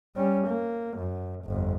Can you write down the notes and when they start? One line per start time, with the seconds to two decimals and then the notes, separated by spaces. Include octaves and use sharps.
0.16 G3 C#4
0.47 A#3
0.97 F#2
1.45 G1 F2